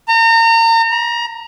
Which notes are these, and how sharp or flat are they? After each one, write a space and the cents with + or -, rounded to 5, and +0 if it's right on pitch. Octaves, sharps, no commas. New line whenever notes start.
A#5 -35
A#5 +30